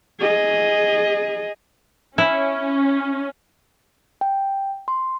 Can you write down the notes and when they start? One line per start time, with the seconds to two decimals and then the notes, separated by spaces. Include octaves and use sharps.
0.20 G#4 D#5
2.18 C#4 E4
4.21 G5
4.88 C6